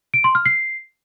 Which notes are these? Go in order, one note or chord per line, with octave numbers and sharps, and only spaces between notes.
D7
C6
F6
C7